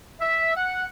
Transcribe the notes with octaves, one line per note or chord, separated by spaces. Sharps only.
E5
F#5